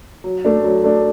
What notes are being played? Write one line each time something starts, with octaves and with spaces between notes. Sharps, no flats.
F#3
A3 D4
F#3
A3 D4